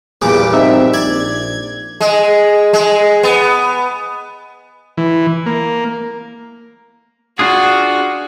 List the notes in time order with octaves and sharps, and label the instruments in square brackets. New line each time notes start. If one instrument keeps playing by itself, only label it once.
[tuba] E2 [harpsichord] G2 A#2 F3 [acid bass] G#4 [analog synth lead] D6
[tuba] C4 [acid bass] D#4 [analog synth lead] E5
[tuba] A#1 [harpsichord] D5 [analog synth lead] G#6
[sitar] G#3
G#3
B3
[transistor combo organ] E3
A#3
[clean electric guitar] D4 F4 G#4 [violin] F#4